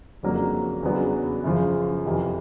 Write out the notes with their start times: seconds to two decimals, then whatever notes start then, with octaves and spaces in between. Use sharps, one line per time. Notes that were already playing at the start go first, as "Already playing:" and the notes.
0.23 F2 C#3 F#3 A#3 D4
0.83 E2 C#3 F#3 B3 D4
1.44 F#2 C#3 F3
2.06 F2 C3 E3